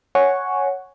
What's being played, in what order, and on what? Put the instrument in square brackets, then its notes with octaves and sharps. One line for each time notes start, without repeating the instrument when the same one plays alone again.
[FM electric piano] C#5 F#5 G#5 C#6